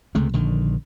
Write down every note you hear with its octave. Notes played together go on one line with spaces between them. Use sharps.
C#2 C3 G#3 A3
A#1 D3 D#3